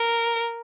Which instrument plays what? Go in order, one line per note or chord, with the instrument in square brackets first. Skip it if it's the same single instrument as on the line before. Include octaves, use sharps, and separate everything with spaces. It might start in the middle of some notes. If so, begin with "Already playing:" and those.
Already playing: [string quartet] A#4